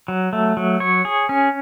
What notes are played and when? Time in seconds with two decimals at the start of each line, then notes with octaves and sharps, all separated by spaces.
0.08 F#3
0.33 A3
0.57 F#3
0.80 C#5
1.05 G#4
1.29 C#4